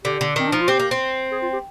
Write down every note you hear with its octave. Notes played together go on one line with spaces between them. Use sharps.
D3 G4
D3
D#3 C4
D4
F3 D#4
F4
C4 G4
A#3
C4
G#4
F4
G4